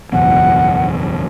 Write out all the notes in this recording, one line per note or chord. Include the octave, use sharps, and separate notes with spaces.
F#1 B1 E2 F#5